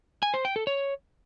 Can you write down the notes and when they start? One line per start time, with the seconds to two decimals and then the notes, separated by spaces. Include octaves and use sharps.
0.23 G#5
0.34 C5
0.45 G5
0.56 A4
0.67 C#5